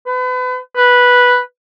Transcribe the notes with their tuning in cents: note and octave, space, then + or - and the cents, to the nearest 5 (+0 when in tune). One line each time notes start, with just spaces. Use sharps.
B4 +35
B4 -5